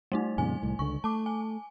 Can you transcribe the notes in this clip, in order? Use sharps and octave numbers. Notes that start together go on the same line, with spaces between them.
G3 A3 D#4
F2 A#2 C#3 G#5
C2 A2
C#2 D3 C#6
A3 A5 D6
G#5